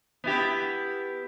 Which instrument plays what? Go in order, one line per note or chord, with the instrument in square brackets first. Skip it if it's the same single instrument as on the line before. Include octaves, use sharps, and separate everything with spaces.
[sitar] B3 E4 G4